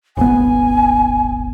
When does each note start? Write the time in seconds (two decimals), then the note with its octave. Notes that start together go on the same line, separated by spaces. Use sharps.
0.17 D#1 G#1 B3 G#5